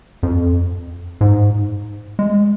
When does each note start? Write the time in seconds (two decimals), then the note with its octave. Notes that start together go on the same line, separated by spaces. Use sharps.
0.23 F2
1.21 G#2
2.19 G#3